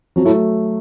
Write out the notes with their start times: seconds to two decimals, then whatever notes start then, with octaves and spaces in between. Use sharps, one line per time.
0.16 F2 F#3
0.25 A2 A3